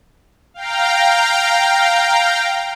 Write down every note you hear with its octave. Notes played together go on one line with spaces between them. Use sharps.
F5 G5 A#5